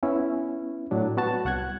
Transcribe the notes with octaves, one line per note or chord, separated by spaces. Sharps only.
B3 C#4 E4
A2 F#3 D4
B3 F#4 A5
C2 F#5 F#6 G#6